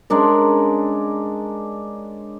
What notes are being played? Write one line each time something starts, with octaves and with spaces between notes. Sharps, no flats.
G#3 C#4 D4 A#4